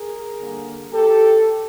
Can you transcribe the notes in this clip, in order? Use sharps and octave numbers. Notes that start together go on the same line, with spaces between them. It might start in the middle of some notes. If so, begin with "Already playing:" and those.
Already playing: G#4 A#4
D3 G3 A#3
G4 A4